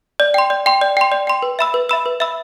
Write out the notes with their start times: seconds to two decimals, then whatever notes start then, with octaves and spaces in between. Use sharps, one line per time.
0.20 D5
0.34 G5 C6
0.50 D5
0.66 G5 C6
0.81 D5
0.97 G5 C6
1.12 D5
1.27 G5 C6
1.42 B4
1.59 E5 B5 E6
1.74 B4
1.89 E5 B5 E6
2.06 B4
2.20 E5 B5 E6